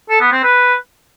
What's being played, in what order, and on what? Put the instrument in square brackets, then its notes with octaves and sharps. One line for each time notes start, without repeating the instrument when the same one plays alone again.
[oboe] A4
B3
C4
B4